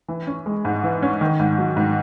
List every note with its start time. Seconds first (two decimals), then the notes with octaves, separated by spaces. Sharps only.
0.08 E3
0.27 C#4
0.46 G#3
0.65 G#2
0.84 E3
1.03 C#4
1.21 D#3
1.40 G#2
1.58 F#3
1.77 G#2